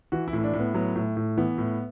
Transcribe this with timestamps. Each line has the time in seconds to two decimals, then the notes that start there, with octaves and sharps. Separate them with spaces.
0.12 E3 F#4
0.28 E4
0.33 A2
0.39 E4
0.44 D4
0.53 A2
0.59 B3
0.74 F#3 B3
0.96 A2
1.17 A2
1.37 E3 B3
1.58 A2